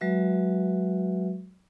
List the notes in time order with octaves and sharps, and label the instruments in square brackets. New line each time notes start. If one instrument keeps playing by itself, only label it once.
[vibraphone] F#3 G#3 F#4 B4 E5